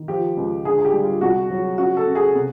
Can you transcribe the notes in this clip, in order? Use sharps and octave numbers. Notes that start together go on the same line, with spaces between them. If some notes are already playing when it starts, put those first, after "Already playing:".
Already playing: D#3
F3 G4
C#2
D3 G#4
G#4
G4
G3
F4
C2 F#4
F#3
C#3 F#4
A4
C#3
G#4
C3